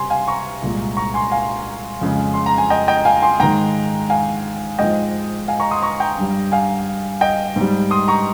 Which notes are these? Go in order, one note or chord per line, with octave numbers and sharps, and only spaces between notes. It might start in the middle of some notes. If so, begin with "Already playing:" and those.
Already playing: C3 G3 G#5 C6
F5 G#5
A#5 C#6
C2 A#2 G#3
A#5 C#6
G#5 C6
F5 G#5
F2 C#3 G#3
C6
A#5
G#5
D#5 G5
D#5 G5
F5 G#5
G#5 C6
G#2 D#3 G#3 G5 A#5
F5 G#5
G#2 F3 G#3 D#5 G5
F5 G#5
A#5 C#6
C6 D#6
A#5 C#6
G5 A#5
G2 G3
F5 G#5
D#5 G5
G#2 G3
C6 D#6
A#5 C#6